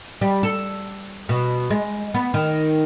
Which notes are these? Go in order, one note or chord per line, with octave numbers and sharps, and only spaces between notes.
G3
A4
B2
G#3
B3
D#3